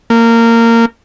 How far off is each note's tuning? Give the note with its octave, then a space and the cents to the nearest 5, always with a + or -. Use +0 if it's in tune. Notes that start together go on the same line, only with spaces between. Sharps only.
A#3 -20